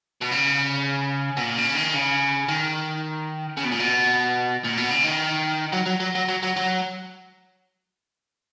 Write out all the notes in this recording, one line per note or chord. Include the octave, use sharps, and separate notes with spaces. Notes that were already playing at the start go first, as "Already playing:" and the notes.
B2
C#3
B2
A#2
C#3
D#3
C#3
D#3
C#3
B2
A#2
B2
A#2
B2
C#3
D#3
F#3
F#3
F#3
F#3
F#3
F#3
F#3